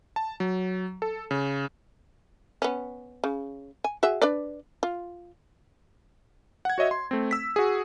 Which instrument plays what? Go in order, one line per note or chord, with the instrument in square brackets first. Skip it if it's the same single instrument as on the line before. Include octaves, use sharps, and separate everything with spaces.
[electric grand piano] A5
F#3
A4
C#3
[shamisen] B3 C#4
C#3
G#5
F#4 G#4 E5
D4 B4 D5
F4
[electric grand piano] F#5 G#6
F#4 C#5 D#5 E5
C6
A3 C4
E6 B6
F#4 G#4